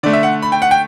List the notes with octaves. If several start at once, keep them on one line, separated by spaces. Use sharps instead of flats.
D3 A3 D5
E5
F#5
B5
G5
F#5
G5